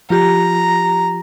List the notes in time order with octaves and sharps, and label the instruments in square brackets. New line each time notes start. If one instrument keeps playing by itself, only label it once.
[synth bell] F3 F4 G4 [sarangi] A#5